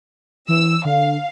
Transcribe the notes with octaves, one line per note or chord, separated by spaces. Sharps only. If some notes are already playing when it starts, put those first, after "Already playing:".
E3 E6
D3 F5